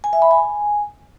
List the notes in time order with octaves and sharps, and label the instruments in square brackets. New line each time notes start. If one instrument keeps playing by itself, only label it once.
[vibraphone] G#5
E5
B5
G#5